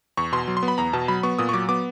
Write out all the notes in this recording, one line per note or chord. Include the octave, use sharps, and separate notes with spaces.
E2 C#6
B2 C6
F#3
C6
B3
B5
E2 A#5
B2 A5
F#3 B5
B3 C#6
A#2 D#6
C#6
F#3 D6
B3 D6